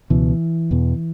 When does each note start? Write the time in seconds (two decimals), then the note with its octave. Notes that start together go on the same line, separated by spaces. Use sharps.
0.10 C#2 B2 E3
0.71 E2 B2